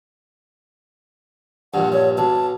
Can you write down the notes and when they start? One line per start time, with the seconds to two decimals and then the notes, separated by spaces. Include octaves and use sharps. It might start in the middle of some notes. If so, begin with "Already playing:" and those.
1.74 A#1 G2 F#5
1.93 C#5
2.18 B1 A5